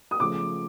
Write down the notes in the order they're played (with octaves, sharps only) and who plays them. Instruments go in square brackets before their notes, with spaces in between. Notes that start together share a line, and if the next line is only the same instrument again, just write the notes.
[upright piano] D#6
[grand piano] C#3 F3 A3 [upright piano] D6